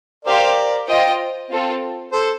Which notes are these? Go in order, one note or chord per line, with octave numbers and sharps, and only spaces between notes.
G4 A#4 C5 D5 F5
F4 C5 D#5 G5
C4 F4 A4
A4 C5